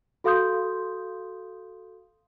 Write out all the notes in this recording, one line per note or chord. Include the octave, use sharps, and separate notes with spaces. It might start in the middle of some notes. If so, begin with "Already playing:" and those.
F#4 A4 F5 C6 D#6 G6